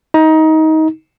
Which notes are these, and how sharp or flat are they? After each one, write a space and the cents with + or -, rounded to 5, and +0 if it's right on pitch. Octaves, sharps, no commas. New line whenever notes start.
D#4 +20